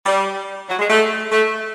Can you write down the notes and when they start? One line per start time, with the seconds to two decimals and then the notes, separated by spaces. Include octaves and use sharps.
0.05 G3
0.69 F#3
0.79 G#3
0.90 A3
1.32 A3